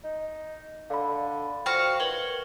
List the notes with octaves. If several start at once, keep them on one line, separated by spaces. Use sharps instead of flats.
D#4
D3 F5 B5
F3 F#4 F5 G5 C#6
D#3 B4 C#5 F#7 G7